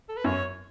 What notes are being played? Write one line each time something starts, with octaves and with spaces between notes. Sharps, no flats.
A4
B4
F#2 C#5